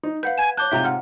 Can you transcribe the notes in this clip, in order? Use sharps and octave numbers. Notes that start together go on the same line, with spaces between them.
D#4
B4 F5 F#5 G6
G#5 G#6 E7
C#5 A5 D6 F#6 G6
G#2 C3 F4 E5 G5 A#5
F#5 F6